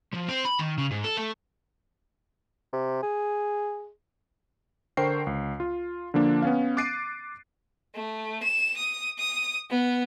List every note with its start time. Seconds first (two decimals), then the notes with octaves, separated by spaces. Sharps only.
0.14 F3
0.29 C4
0.45 B5
0.59 D#3
0.78 C#3
0.91 G#2
1.04 A4
1.17 A3
2.73 C3
3.02 G#4
4.97 D3 A#4 C5 G5 C#6 C7
5.27 C#2
5.60 F4
6.14 D3 F3 A#3 D4
6.42 B3 C#4 F5
6.77 D6 F#6 A6 C7 D7 D#7
7.95 A3
8.43 E7
8.77 D#6
9.18 D#6
9.70 B3